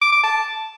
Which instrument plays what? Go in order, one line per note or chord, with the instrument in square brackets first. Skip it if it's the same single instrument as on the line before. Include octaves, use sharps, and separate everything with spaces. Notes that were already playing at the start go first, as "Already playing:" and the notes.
[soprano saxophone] D6
D6
A5